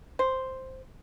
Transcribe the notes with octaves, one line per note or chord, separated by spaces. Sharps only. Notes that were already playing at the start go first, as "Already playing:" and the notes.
C5